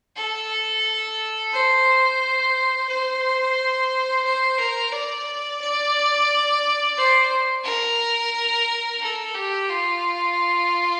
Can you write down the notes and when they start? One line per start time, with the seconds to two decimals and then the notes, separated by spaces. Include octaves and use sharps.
0.16 A4
1.52 C5
2.88 C5
4.25 C5
4.58 A#4
4.92 D5
5.61 D5
6.97 C5
7.64 A#4
9.01 A4
9.34 G4
9.69 F4